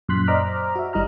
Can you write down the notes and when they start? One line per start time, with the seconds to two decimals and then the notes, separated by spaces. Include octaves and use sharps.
0.09 F#2 A#2 C6 F#6 B6
0.27 C5 D5 D#5 A#5 D6 F6
0.76 F#4 E5
0.93 G#1 G3 E4 D#5 A#5 F6